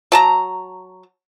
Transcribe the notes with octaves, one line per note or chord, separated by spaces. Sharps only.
F#3 A5 A#5